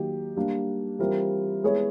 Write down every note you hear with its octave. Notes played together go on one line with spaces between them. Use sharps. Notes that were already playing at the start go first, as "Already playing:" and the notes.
Already playing: D#3 F#3 A#3 D#4 G4
G3 A#3 D4
E3 G3 C4 F4 A#4
G#3 B3 E4 G#4 C#5